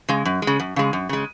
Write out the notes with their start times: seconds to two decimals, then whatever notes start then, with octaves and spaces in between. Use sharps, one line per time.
0.09 C#3 G#3
0.25 F#2
0.42 G#3
0.47 C#3
0.60 F#2
0.76 C#3 G#3
0.93 F#2
1.09 C#3 G#3